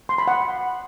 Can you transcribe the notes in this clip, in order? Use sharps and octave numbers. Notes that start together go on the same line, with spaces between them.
C6
B5
F#5